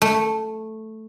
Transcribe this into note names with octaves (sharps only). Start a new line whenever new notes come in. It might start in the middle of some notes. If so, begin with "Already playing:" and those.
A3